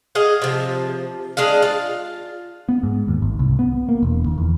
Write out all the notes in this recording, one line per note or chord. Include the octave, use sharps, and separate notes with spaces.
G#4 D#5 F5 F#5
C3 F3
G#3 D4 G#4 F5
F4
B3
G#2
D#2
G#1
C2
B3
A#3
E1
D#2
E2